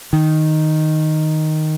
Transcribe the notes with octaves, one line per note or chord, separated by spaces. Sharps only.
D#3